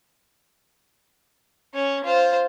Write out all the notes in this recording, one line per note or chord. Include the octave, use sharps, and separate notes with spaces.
C#4 C#5
F4 C5